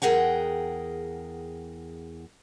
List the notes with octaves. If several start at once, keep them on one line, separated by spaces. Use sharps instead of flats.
E2 G#4 A#4 F#5 G5